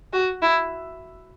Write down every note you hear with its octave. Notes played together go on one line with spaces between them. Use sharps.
F#4
E4